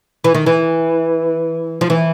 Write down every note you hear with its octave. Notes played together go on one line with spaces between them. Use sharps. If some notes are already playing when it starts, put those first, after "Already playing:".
E3
D#3
E3
F3
E3